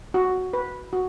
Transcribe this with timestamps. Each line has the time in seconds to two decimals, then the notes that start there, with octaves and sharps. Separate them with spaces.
0.14 F#4
0.53 B4
0.93 F#4